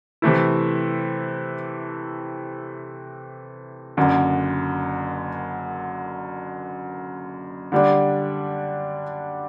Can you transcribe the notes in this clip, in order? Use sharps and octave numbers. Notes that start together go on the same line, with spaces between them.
C3 E3 A3 E4
F#1 F#2 D3
D3 G3 D4